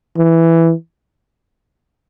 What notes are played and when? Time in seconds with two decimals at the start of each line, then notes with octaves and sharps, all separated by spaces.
0.17 E3